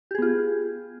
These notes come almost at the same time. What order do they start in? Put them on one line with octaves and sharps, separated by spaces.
G4 G#4 B3 F4